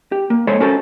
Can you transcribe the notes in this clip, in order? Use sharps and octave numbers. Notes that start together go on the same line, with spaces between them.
G4
A#3
G#3 A4 C5 C#5 B5
C#4 F#4 A4 A#4 C5